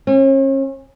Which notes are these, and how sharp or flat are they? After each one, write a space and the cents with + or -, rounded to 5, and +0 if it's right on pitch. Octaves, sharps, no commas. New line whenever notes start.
C#4 -40